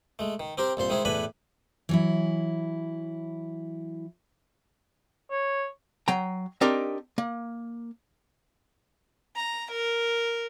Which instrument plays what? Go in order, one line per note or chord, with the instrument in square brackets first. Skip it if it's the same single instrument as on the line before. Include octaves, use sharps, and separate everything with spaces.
[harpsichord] G#3 A3
D#3
C4 G4 A#4 C5
C2 A#2 C5 C6
D#3 G#3 E4 G#4 C5
E2 A2 D4 B4 G#5 B5
[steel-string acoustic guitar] E3 F#3 E4
[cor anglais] C#5
[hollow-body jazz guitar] F#3 G5 A#5
C4 D4 D#4 G4 A#4
A#3
[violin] A#5
A#4